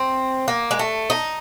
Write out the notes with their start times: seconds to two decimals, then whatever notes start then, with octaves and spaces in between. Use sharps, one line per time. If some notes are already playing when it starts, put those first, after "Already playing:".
Already playing: C4
0.48 A#3
0.71 G#3
0.79 A3
1.10 D#4